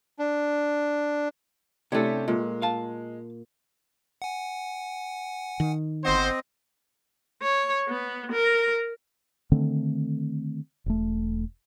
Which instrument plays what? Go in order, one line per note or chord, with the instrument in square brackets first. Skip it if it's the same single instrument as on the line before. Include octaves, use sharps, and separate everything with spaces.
[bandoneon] D4
[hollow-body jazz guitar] C3 C#4 [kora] A3 C#5 [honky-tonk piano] D4 E4 G4
[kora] A#2 [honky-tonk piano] G#3
[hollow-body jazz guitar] F5 A5
[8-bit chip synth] F#5 G#5
[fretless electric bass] D#3
[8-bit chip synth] G1 F#5 [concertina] C4 D#5 [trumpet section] C5
[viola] C#5
B3
A#4
[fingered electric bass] D3 D#3 A3 C4
E1 A3